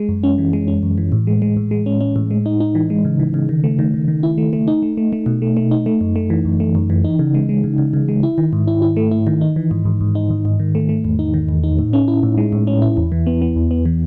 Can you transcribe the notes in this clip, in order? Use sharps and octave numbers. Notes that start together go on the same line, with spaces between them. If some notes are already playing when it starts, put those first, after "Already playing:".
Already playing: G#3
F#2
C#4
E3
G#3
C#4
F#2
E3
A2
G#3
G#3
A2
G#3
C#4
C#4
A2
G#3
D#4
D#4
E3
G#3
C#3
E3
C#3
D#3
A3
D#3
D#3
D#3
E4
A3
A3
D#4
A3
A3
A3
B2
A3
A3
D#4
A3
F#2
A3
E3
F#2
A3
F#2
E3
D#4
C#3
G#3
G#3
C#3
C#3
C#3
G#3
E4
D#3
G#2
E4
E4
A3
E4
D#3
D#4
E3
G#2
G#2
G#2
D#4
G#2
G#2
D#3
A3
A3
E2
D#4
D#3
E2
D#4
A2
C#4
E4
A2
G#3
A2
C#4
E4
E2
E3
B3
B3
E2
B3
E3